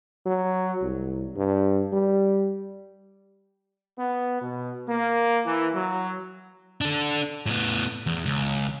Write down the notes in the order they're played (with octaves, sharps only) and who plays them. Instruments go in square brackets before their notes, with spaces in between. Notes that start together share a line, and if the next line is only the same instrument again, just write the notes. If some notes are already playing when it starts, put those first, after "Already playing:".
[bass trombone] F#3
C2
G2
G3
[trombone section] B3
B2
A#3
E3
F#3
[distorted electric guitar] D4 A4
A2 B3
E2
C#2